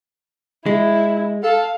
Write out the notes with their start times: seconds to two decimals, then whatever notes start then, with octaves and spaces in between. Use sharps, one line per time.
0.66 G#3 E4
1.43 A4 F5